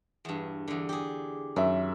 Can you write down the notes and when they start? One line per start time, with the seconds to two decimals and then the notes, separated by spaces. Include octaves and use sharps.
0.25 E2 G2
0.68 E2 D3
0.89 G4 G#4
1.56 F#2 D#3 E5